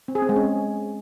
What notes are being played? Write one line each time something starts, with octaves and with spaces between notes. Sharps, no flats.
C4
G#4
C4
G#3
C#4